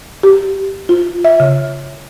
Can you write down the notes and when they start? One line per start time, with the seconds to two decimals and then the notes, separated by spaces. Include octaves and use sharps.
0.23 G4
0.89 F4
1.25 E5
1.40 C#3